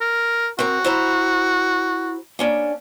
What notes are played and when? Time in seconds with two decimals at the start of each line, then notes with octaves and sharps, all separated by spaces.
0.01 A#4
0.59 C4 F#4 A#4
0.84 E4 C5 A#5
2.39 A#3 C#4 D4